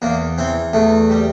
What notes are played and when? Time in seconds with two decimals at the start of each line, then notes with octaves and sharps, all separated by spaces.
0.02 E2 A#3
0.38 E3 C4
0.73 E2 A3
1.10 G3